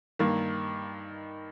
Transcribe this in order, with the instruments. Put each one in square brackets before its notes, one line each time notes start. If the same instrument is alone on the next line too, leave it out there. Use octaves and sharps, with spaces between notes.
[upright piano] G2 D#3 A#3